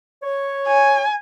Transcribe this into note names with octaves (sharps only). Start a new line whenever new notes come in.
C#5
G#5